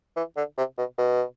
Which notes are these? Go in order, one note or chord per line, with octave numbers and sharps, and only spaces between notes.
E3
D3
C3
B2
B2